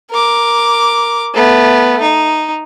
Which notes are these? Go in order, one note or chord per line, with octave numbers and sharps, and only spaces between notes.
A#4 D6
A3 B3
D#4